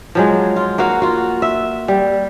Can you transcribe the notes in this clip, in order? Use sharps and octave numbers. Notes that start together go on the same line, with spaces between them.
F3 F#3 G#3
F4
A#3 F#4 F5 F#5
F4 F#4
E5
G3